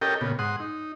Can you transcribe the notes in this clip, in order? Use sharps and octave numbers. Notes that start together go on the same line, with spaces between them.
C#4 G4 A4 A#4 D#5 G5
A#2 C#3 B3
G#2 F#5 C6 D#6
D#4